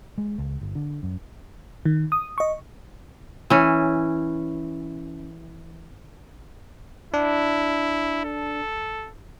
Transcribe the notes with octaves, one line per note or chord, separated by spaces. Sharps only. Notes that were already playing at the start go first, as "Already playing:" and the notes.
G#3
C#2
G1
D3
F#2
D#3
D#6
D#5 C#6
E3 C#4
D4 E4
A4